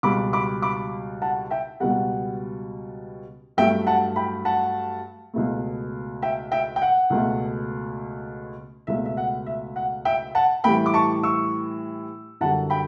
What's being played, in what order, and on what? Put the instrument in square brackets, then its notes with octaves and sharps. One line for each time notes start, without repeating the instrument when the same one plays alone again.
[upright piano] C#2 B2 G3 B5 D6
B5 D6
B5 D6
F#5 A5
E5 G5
C#2 B2 G3 F#5
G2 F#3 A3 E5 G5
F#5 A5
G5 B5
F#5 A5
C#2 B2 A3
E5 G5
E5 G5
G5
F#5
C#2 B2 A3
C#2 B2 A3 E5
E5
F#5
E5
F#5
E5 G5
F#5 A5
A2 E3 G3 G5 B5
D6
A5 C#6
C#6 E6
F#2 D3 G3 F#5 A5
G5 B5